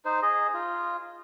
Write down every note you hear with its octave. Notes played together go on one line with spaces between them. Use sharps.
D#4 C5
G#4 D#5
F4